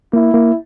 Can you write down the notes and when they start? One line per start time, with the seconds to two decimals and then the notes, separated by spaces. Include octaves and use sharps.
0.13 A#3 E4
0.34 A#3